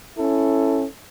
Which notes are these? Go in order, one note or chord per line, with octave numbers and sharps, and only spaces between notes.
C#4 E4 A4